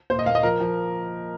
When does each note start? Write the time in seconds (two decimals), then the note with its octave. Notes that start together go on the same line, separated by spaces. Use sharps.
0.10 A#2 C5
0.19 D#5
0.26 A#3 F5
0.35 D#5
0.43 F3 A#4
0.60 F3